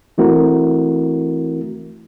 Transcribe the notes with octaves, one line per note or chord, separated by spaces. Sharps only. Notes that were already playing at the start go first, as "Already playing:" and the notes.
E3 A3 C4 E4 F#4 A#4